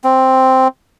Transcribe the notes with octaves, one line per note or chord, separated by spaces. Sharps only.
C4